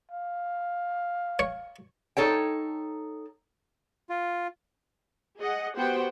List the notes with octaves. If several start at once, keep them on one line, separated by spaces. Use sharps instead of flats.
F5
C#5
D#4 A4 C#5 G5
F4
G#4 D#5 F#5
B3 F#4 G4 C5 F#5 G5